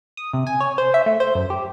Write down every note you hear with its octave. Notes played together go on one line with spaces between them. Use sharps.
D#6
C3
G#5
C#5
C5
E5
A3
C5
F#2
G4